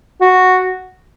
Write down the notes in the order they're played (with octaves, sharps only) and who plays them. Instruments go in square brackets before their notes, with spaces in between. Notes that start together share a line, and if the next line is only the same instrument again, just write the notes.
[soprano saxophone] F#4